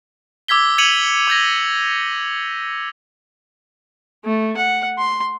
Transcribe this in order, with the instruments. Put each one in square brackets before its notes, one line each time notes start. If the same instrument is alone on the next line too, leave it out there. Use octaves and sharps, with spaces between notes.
[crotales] D6 E6 G#6 B6 G7
G#6 C#7 D#7 F7 F#7
D6 G6 G#6 A#6
[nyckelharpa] A3
F#5
C6